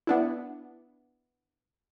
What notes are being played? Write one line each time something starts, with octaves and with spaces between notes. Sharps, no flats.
B3 D4 E4